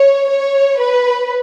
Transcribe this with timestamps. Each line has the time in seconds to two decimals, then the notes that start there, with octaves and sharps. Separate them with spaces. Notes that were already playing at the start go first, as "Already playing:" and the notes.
Already playing: C#5
0.30 C#5
0.79 B4